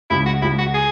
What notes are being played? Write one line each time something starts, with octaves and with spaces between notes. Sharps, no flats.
C#2 E4
F#4
C#2 E4
F#4
G#4